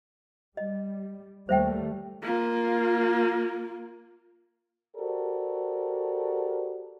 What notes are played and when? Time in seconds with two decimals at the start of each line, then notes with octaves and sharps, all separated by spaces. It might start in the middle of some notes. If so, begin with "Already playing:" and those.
0.57 G3 D#5
1.49 D#2 G3 A3 C5 E5 G5
2.22 A#3 F4
4.96 F#4 G4 A4 A#4 C5 D5